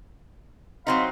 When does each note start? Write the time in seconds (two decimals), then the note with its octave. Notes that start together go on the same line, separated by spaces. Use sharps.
0.87 F#3 C4 D#4 F5 B5 C6